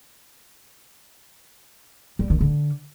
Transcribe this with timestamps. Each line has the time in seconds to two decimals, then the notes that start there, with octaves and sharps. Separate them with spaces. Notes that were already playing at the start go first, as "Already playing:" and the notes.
2.19 G3
2.30 D#3
2.41 D3